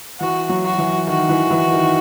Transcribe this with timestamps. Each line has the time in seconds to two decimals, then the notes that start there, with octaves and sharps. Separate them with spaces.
0.20 E3 F#4
0.49 F#3
0.64 F#4
0.78 E3
1.07 D#3 F#4
1.29 E3
1.51 E3
1.73 D#3